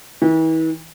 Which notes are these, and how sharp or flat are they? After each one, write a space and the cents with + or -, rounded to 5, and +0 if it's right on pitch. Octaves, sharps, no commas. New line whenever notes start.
E3 -40